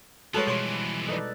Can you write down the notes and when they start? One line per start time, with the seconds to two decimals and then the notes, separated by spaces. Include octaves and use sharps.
0.34 F3 G3 G#3 F#4 A4 B4 C#5
0.47 B2 E3 F3 C#5 C6
1.08 D#4 A4 B4 D5